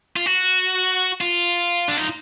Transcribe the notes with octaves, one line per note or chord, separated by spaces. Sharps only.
F4
F#4
F4
D4
D#4